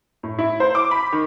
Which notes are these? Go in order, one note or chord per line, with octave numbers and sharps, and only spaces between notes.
A2
E4
C5
D6
B5
D#3